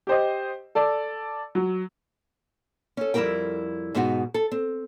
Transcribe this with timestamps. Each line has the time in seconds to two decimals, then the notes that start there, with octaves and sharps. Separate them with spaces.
0.07 G4 C5 D#5
0.75 A4 D5
1.55 F#3
2.97 C#4 A4
3.14 F2 G3 E4 G4 A#4 G5
3.94 G#2 B2 G#3 D#4 F#4
4.34 A4
4.52 C4